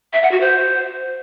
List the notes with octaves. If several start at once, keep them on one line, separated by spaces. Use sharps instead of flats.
E5
F#5
F#4
C5